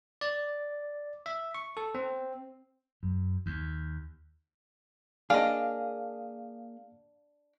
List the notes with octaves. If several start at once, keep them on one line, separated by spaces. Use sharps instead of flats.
D5
E5
C#6
A4
C4
F#2
D#2
A#3 D4 G#4 D#5 F5